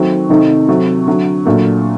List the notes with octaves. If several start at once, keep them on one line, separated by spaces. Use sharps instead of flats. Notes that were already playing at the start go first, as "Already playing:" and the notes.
Already playing: D#3 F#3 A3 C4
C3 D#3 A3 D#4
C3 F#3 A3
D3 F#3 A3
A#2 F#3 A3 D4